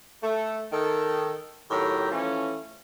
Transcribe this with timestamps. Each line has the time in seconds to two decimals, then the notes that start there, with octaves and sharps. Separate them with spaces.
0.22 A3
0.72 D#3 A4
1.70 A2 D#3 F#3 G4 A#5
2.11 E3 F3 A3 C#4